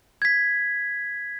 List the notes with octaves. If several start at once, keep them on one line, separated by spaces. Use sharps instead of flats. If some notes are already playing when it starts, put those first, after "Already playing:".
G#6 B6